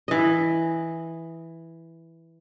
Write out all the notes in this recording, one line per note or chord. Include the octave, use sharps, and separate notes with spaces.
E3 D#5